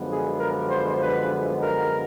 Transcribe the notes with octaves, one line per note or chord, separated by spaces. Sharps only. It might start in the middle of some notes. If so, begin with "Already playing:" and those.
Already playing: F#2 D3 F3 G#3 B3
G#4
A#4
C5
B4
A#4